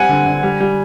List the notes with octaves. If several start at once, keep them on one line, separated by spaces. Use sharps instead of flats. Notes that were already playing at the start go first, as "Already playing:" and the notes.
Already playing: G3 C4 F#5 G#5
D3
D3
G3
G3